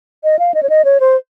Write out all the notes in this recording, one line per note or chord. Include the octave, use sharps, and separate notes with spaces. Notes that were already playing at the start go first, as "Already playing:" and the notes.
D#5
F5
D#5
C#5
D#5
C#5
C5